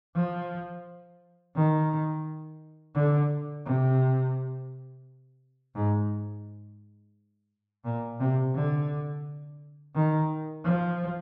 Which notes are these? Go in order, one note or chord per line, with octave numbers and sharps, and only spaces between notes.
F3
D#3
D3
C3
G#2
A#2
C3
D3
D#3
F3